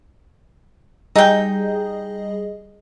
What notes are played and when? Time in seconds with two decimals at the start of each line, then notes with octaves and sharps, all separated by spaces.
1.16 G3 D#4 G#4 D#5 G5